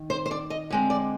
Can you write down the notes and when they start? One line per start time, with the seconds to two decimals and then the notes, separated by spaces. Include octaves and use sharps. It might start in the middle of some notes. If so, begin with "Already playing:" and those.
Already playing: D#3
0.10 C5
0.26 C5
0.31 D5
0.50 D#5
0.70 D3 G#3 C4
0.90 D5